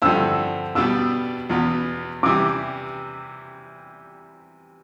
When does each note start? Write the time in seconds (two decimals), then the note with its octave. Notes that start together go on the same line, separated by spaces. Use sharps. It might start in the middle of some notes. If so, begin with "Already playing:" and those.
0.02 G2 D3 F3 C4 E4 E6
0.75 B2 G3 B3 D4 E6
1.50 E2 B2 B3
2.23 C3 E3 G3 D6